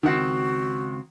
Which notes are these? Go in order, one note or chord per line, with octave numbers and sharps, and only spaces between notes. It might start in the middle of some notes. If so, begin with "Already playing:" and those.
C#2 D#3 C4 F#4 F#5